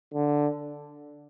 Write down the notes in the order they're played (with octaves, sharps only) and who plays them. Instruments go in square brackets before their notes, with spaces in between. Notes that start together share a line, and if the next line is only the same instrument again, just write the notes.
[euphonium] D3